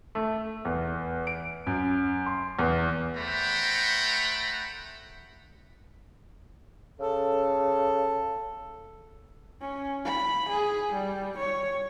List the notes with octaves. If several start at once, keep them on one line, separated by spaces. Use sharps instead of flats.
A3
E2
D7
F#2
C6
E2
A3 C5 F#5 G5 A#5 B5
C#3 A4
C#4
B5
G#4
G3
C#5